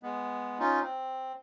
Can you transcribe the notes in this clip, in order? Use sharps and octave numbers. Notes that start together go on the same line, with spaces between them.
G#3 B3
C#4 D#4 F4
C4